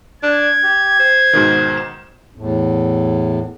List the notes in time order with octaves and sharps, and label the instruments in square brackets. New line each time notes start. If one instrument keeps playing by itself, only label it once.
[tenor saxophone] D4 [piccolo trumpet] G#6
[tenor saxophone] G4
C5
[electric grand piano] G#2 B2 D#3
E7
[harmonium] E2 A2